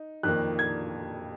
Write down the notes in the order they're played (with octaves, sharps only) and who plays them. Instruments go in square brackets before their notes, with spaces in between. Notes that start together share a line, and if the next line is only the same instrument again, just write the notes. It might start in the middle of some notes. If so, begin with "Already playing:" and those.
Already playing: [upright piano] D#4
[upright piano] F2 D#3 A#3 [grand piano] F#6
[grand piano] G#6